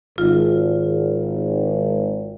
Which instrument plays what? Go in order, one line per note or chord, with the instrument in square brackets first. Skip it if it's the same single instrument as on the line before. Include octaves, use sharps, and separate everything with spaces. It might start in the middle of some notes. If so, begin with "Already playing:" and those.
[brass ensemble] G#1 [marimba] F4